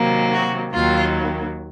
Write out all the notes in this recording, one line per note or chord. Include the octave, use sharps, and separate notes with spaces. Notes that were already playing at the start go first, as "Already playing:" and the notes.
Already playing: C3 D#3 F#3 A#3
F#4
D#2 D#3 F#3 A#3 F4